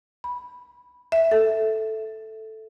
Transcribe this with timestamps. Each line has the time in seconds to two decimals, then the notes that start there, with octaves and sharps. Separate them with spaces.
0.24 B5
1.12 E5
1.32 A4